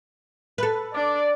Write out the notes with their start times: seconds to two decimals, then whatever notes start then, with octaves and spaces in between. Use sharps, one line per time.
0.58 A4 B4
0.94 D4 D5